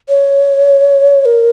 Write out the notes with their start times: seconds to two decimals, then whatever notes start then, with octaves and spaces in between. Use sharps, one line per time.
0.09 C#5
1.25 A#4